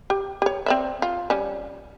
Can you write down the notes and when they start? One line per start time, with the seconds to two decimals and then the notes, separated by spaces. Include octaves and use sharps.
0.10 G4
0.42 G4 C#5
0.66 C4 D5 E5
1.02 F4
1.30 G3 C#4